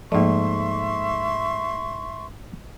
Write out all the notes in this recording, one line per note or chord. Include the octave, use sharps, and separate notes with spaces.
G#2 F3 A3 A#3 E5 C6 C#6